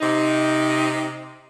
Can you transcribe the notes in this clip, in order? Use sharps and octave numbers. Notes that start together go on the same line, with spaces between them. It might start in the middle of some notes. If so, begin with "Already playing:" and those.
C3 D#4